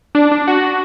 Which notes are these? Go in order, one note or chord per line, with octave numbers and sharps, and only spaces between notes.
D4
D4
F#4